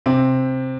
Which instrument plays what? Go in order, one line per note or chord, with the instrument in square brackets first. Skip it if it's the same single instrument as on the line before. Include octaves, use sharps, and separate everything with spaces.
[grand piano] C3 C4